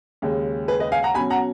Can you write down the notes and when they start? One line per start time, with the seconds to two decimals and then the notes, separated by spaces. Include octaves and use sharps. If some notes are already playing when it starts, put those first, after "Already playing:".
0.22 D#2 C#3 G#3 C#4
0.68 G#4 B4
0.80 B4 D#5
0.92 F5 G#5
1.03 F#5 A#5
1.14 B2 F#3 C#4 G#5 B5
1.30 F#5 A#5